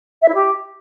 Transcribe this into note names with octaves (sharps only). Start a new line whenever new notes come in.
E5
E4
G4